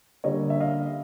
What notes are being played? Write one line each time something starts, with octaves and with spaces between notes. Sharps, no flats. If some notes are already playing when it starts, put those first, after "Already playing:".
D3 G3 A#3 C#4 C#5 D#5
E5
D#5 F5